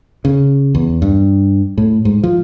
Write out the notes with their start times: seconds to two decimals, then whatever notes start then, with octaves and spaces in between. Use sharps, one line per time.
0.25 C#3
0.75 E2
1.02 G2
1.78 A2
2.05 G#2
2.23 F3